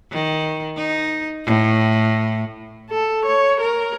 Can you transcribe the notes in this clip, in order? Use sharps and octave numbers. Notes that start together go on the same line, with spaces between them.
D#3
D#4
A2
A4
C#5
A#4